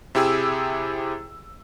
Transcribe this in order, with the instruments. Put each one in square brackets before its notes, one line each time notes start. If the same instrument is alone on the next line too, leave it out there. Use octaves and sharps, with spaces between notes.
[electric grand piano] C3 E4 G4 G#4 E6